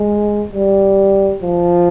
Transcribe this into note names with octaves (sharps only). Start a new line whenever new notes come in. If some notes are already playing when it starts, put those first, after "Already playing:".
Already playing: G#3
G3
F3